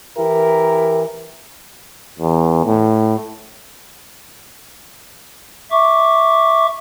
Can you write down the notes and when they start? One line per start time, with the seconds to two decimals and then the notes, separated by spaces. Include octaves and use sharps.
0.18 E3 E4 G4 A#4
2.19 E2
2.65 A2
5.72 E5 C#6 D6